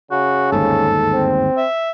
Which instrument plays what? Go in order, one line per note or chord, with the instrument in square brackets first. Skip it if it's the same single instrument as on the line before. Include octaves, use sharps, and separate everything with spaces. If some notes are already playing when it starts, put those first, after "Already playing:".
[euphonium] C#3 [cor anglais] F#4
[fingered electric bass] G1 D#2 G#2 [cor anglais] A4
[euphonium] C4
[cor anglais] E5